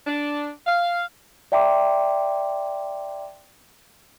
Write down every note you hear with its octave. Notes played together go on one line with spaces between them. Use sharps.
D4
F5
D5 E5 G5 A#5 C6 D6